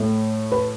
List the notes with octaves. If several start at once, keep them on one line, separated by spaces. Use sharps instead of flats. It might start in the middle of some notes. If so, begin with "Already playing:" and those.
Already playing: A2 A3
B4